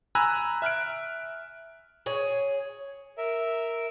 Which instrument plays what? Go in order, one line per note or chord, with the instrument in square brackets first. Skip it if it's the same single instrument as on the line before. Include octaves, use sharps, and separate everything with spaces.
[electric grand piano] G#5 A#5 B5 E6 F#6
E5 F6 F#6 D7
[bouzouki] G#4 C#5
[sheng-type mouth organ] A#4 E5